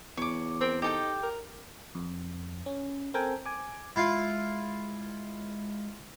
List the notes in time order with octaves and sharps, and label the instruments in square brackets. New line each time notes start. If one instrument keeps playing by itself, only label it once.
[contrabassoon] E2 [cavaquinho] C#5 D6
[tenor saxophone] C4 [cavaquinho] A#4
[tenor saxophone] D#4 [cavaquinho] G4 A4 G5
[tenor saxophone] A#4
[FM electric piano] F2
C#4
C4 A4 A#4 G5 G#5
G#5 D6
[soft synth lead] G#3 [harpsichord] E4 F4 F5